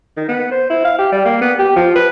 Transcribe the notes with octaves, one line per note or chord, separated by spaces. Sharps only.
D#3
B3
C5
E4
F5
G4
G3
A#3
B3
G4
F3
B4